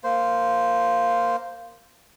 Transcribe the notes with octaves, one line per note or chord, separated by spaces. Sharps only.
A#3 C5